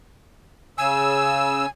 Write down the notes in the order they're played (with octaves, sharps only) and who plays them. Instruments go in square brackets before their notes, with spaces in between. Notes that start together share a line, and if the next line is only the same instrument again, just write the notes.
[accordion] C#3 E6 [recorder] G#5